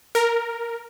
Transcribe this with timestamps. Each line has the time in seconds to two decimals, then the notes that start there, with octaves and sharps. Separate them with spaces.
0.15 A#4